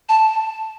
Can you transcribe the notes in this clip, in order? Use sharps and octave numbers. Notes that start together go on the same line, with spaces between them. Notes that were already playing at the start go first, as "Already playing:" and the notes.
A5